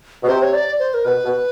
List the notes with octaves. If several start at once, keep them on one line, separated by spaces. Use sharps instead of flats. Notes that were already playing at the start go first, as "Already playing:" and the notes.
B2
C3 C5
C#5
D5
C5
A#4
B2 B4
B2